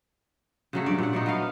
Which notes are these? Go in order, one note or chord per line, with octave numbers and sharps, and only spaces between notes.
C#3 F#3 A3
G2 D5
A#2 F#5
F#3 A3 D#4
B3 D#5 F5